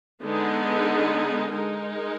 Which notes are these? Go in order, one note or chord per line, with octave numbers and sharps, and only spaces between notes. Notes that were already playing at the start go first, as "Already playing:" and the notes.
D3 G#3 B3 D#4
G#3 D#4 A#4